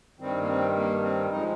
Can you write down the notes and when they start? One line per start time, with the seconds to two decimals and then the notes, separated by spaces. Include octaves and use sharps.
0.20 G2 D#3 G3 C4
0.41 A#3
0.48 C4
0.76 A#3
1.03 C4
1.31 F3 G#3 D#4